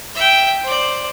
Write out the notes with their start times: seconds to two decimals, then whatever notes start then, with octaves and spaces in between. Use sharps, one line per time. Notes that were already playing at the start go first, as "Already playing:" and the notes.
0.15 E5 G5
0.64 C5 D5